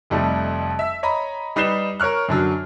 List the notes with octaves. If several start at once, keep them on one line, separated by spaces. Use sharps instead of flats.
F1 F2 G3 A3 D#4
E5 E6
C#5 D#5 A#5 B5
G3 D#4 B4 C7 E7 G7
A#4 C#5 C#6 F6 F#6
F#2 D3 F#3